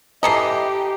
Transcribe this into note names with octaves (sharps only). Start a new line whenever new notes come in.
E3 G4 A4 D#5 A#5 C7